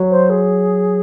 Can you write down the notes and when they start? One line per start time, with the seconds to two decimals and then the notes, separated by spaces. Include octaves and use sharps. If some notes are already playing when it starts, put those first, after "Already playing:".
Already playing: F#3
0.11 C5
0.30 G#4